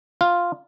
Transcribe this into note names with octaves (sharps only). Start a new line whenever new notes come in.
F4